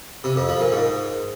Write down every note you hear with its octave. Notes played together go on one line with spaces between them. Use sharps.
C3
F2
F3
A#2
G#2